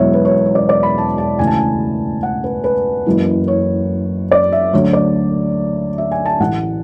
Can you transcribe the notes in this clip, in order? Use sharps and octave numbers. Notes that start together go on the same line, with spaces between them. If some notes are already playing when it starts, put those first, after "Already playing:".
Already playing: E1 E2 B2 F#3 C#5 E5
B4
C#5
C#5
D5
D5
B5
A5
A5
D2 C#3 E3 G#5
A5
G#5
F#5
B4
B4
F#1 F#2 E3
C#5
D5
E5
D2 D3 F#3 C#5
D5
E5
G#5
A5
A1 A2 E3 F#5